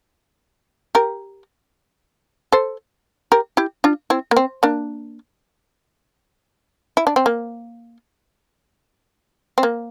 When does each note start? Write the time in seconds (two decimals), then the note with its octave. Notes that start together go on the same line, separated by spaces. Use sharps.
0.95 G4 A#4
2.52 A4 C5
3.32 G4 A#4
3.57 E4 G4
3.84 D4 F4
4.10 C4 E4
4.31 A#3
4.37 C4
4.63 A#3 D4
6.97 E4
7.07 D4
7.16 C4
7.26 A#3
9.58 C4
9.63 A#3